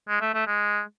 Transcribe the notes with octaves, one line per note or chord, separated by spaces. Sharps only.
G#3
A3
A3
G#3